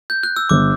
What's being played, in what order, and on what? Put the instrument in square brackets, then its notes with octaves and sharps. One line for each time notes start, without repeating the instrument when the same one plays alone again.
[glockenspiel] G6
F#6
E6
[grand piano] G1 [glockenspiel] D6